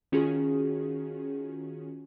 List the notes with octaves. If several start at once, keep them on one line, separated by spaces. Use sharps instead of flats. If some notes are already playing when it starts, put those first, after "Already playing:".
D#3 C#4 F4 F#4 G#4